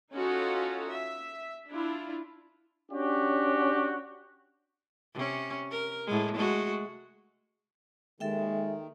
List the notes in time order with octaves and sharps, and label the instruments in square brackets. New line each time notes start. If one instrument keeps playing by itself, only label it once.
[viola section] C#4 D#4 F4 F#4 A4
E5
D4 E4 F4
[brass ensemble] C#4 D4 F#4 G4
[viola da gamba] C3 C#4
A#4
A2 G#3
G#3 A3 F#4
[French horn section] D#2 G#3 [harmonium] D#3 [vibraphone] A4 E5 G5